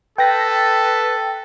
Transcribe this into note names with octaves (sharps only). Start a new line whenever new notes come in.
A4 B4 G5 A#6